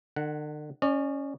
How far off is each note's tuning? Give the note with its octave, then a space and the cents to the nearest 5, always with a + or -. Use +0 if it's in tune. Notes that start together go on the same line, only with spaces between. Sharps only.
D3 +45 F#5 +0
C#4 +0 D5 +40